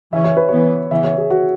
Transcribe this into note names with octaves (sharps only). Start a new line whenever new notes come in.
C#3 E3 C#4 E5
C#5
B4
E3 B3 C#5
C#3 E3 B3 E5
C#5
G#4
F#4